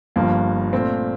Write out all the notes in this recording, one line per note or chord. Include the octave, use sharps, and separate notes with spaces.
G1 G2 F3 A#3
A#2 A3 C4